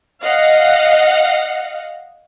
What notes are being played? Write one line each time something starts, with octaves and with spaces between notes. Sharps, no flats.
D#5 F5 F#5